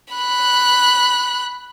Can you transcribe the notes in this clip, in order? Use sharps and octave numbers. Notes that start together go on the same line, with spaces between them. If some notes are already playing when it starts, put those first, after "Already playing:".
B5 F#6